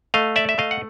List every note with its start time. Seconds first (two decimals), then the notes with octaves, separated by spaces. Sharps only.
0.14 A3 D#5 F5
0.36 D5 E5
0.49 E5
0.58 A3 D#5 F5
0.71 F#5